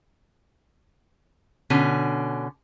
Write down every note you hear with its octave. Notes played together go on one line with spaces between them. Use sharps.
B2 D3 C#4